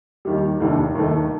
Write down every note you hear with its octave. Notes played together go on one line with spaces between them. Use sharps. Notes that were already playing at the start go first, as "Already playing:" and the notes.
D#2 D#3 G3
F1 D#2 D3 A3
D#2 D#3 A3